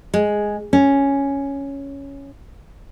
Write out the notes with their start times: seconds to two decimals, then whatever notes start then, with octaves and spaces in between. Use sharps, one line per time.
0.14 G#3
0.73 C#4